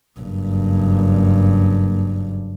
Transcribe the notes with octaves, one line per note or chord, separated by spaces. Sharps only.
F#1 G2